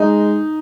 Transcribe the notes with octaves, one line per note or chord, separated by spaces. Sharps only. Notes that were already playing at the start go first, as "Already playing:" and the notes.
Already playing: G#3 D#4